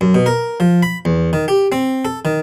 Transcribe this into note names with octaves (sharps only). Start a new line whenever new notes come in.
F#2
B2
A#4
F3
B5
E2
D#3
G4
C4
A4
D#3